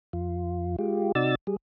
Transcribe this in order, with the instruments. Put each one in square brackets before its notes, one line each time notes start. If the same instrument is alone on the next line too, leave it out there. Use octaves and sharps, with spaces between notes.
[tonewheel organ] F2 F4
G#3 F4 G4
C3 D#4 F#4 D5 E6 A6
G3 G#4